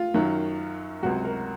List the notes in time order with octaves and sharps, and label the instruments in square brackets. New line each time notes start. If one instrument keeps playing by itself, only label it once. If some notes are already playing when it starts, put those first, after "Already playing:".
Already playing: [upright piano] F4
F#2 D#3 F#3
C#2 C3 F#3 F#4
A#4